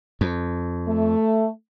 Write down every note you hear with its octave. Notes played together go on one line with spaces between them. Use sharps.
F2
A3